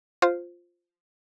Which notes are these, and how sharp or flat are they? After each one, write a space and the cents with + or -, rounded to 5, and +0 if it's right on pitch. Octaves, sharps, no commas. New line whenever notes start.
F4 +0 C5 +0